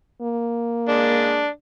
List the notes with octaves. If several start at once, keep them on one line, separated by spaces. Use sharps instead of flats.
A#3
G#3 D4